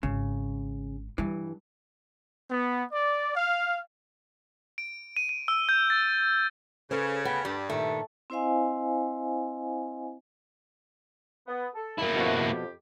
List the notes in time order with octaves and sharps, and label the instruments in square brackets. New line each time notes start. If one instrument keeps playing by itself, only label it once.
[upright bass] G#1 [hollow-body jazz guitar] C#3
[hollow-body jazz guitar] G2 E3 [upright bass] G3
[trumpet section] B3
D5
F5
[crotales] D7
D#7
D#7
E6
G6
A6
[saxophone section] C#3 [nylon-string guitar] A4 B4 C5
[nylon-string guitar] D2 G5 [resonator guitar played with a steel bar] B3
[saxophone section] G2 [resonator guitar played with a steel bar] G3
[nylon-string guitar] A#2 D#3 [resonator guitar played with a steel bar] A3
[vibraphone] C4 E4 C5 D#5 F5 G#5
[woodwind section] B3
A4
[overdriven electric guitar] A#3 E4
[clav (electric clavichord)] B2 F3 [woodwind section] A3 F#4
[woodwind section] F2 G4